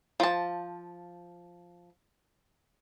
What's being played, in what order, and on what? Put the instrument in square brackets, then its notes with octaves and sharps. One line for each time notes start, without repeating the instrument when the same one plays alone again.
[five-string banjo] F3 A5